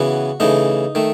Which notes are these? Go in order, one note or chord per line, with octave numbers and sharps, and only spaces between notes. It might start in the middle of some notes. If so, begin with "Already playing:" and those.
Already playing: C#3 E3 B3 F#4
C#3 E3 A3 D#4
D#3 A3